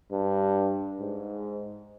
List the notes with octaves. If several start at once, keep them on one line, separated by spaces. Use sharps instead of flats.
G2
G#2